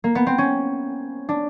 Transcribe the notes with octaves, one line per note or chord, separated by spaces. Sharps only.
A#3
B3
C4
C#4
D4